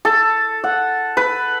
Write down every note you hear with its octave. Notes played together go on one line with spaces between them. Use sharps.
A4
F#5
B4